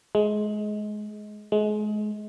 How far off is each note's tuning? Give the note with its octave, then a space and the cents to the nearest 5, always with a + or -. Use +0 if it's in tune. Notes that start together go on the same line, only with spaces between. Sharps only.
G#3 +20
G#3 +30